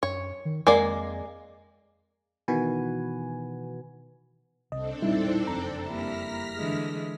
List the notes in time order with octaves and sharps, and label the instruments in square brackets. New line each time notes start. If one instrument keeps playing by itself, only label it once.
[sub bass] F#2 [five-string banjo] C#5
[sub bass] D#3
[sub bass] F2 [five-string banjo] G#3 A#3 D5
[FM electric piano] B2 D#3 E3 F#4 B4 G#5
[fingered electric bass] C2 [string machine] C4 D4 A4 [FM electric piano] D#5
[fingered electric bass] E1 A#1 G3 [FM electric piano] D#4 E4
[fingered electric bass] F#1 F2 [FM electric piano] A#5
[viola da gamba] G3 A#3 E4 [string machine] F6 A#6 B6
[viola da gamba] D3 E3 G#3